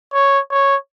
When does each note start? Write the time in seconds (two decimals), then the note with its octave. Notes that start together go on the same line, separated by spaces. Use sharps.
0.14 C#5
0.50 C#5